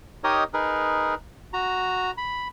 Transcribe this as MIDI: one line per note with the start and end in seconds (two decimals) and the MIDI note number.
0.24 0.44 63
0.24 0.44 67
0.24 0.44 70
0.24 0.44 73
0.24 0.44 75
0.24 0.44 87
0.54 1.15 63
0.54 1.15 68
0.54 1.15 70
0.54 1.15 71
1.53 2.12 66
1.53 2.12 82
2.18 2.48 83